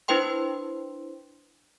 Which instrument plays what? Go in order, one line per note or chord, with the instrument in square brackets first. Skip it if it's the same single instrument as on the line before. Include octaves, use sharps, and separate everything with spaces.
[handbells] D4 E4 B4 C5 G5 C6